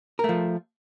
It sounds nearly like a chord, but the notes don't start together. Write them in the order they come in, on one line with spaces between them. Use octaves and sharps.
A#4 A3 F3